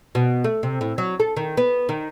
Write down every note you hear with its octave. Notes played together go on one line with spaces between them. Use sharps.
B2
A3
C3
A2
F#3
A4
D#3
B3
D#3